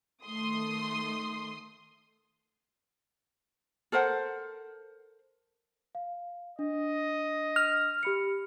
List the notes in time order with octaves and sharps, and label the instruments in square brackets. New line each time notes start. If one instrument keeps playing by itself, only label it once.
[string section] D#3 A3 C6 D#6
[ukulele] A4 A#4 C5 F#5
[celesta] F5
[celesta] D4 [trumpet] D#5
[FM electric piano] F6
[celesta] G4 B5 C#7